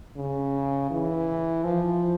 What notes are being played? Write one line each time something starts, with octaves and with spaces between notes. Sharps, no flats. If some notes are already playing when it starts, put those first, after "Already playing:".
C#3
E3
F3